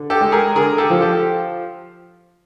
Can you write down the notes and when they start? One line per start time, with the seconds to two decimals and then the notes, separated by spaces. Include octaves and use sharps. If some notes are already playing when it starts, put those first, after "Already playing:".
Already playing: D3
0.10 G4 A4
0.21 G#3
0.32 G#4 A#4
0.55 D3 G#4 A#4
0.78 G4 A4
0.90 F3
1.01 G4 A4